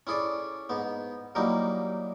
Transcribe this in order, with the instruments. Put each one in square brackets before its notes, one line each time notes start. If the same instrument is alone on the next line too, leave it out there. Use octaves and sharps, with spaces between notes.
[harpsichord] C#4 E4 G#4 A4 D5
G#2 B3
F#3 G3 A#3 D#4 E4